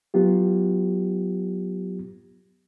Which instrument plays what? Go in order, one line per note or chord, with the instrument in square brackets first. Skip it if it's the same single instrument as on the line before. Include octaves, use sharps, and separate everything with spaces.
[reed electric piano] F#3 B3 F4 G4